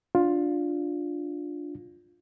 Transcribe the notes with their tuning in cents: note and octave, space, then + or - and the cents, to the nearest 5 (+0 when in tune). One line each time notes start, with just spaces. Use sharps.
D4 +0 F4 +10